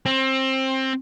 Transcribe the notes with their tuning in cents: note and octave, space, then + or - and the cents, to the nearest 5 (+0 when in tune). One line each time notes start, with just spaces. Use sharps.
C4 +20